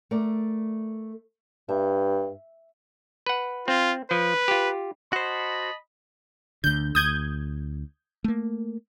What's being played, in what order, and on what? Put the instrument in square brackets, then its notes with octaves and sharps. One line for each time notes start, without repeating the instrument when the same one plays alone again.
[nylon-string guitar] A3 A#4 D5
[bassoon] G2 [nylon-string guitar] E5
[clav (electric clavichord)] B4 F#5
[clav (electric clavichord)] C4 [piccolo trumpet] F4
[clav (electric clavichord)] F3 [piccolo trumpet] B4
[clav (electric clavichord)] F4 G4
[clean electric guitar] F#4 C5 [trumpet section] D#5 A5 B5
[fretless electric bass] D2 D3 [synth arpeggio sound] G6
[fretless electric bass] D2 [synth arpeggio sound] D#6 G6 G#6
[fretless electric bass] A3 A#3